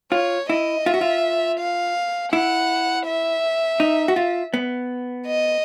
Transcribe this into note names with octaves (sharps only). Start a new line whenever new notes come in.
F4 C#5
E4 D#5
F4 E5
F#4
F4
F5
E4 F#5
E5
D#4
F#4
F4
B3
D#5